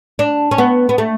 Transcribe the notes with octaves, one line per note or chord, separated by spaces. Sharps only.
D4
C#4
B3
B3
A3